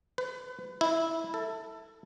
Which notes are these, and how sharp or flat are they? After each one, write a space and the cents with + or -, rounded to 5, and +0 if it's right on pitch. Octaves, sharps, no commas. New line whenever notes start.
B4 +30
E4 -10
A4 +20